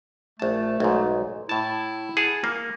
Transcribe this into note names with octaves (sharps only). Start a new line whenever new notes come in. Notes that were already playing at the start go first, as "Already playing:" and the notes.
A#1 A3 A5
B1 G#2
A2 E4 A5
G#4 F#5 A5
A#3